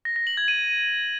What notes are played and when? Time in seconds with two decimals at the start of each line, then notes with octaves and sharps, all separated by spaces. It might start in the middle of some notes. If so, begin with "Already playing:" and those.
0.05 A#6
0.16 A#6
0.27 F#7
0.37 G#6
0.48 D#7